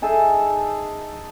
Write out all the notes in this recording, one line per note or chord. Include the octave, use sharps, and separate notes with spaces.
D#4 G#4 A4 E5